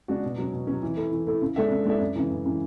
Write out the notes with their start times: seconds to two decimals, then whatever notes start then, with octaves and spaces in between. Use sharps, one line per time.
0.08 C#3 G#3 D4 F#4
0.23 B2
0.38 F#3 C#4
0.53 B2
0.67 F#3 C#4
0.82 E3
0.97 A3 E4
1.12 E3
1.27 A3 E4
1.42 C#3
1.56 G#3 D4 A4 E5
1.71 C#3
1.86 G#3 D4 A4 E5
2.00 F#2
2.16 C#3 E3
2.30 F#2
2.45 C#3 E3